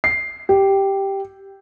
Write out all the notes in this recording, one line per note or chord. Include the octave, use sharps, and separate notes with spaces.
C7
G4